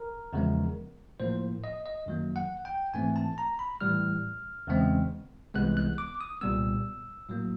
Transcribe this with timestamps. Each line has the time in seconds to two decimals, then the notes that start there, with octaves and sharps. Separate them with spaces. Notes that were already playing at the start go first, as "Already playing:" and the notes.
Already playing: A#4
0.33 E2 C#3 F3 G#3 B3
1.20 A2 F3 A#3 C5
1.64 D#5
1.86 D#5
2.06 F#2 D#3 F#3 A#3
2.36 F#5
2.65 G5
2.94 G#2 E3 A3 C4 G#5
3.16 A5
3.38 A#5
3.59 B5
3.81 A2 E3 G3 F6
4.67 E2 C#3 E3 G#3 C4
5.54 C2 C3 E3 G#3 B3 F#6
5.77 F#6
5.98 D6
6.21 D#6
6.41 C2 A#2 G3 B3 E6
7.29 A2 F#3 A#3